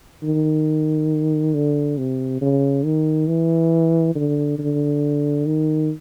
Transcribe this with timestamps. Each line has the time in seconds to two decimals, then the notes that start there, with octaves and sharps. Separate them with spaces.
0.23 D#3
1.54 D3
1.98 C3
2.41 C#3
2.84 D#3
3.28 E3
4.15 D3
4.58 D3
5.46 D#3